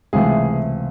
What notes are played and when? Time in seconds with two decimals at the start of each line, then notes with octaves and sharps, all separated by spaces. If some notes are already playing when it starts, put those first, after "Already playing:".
0.13 C#2 C3 E3 A3 G#4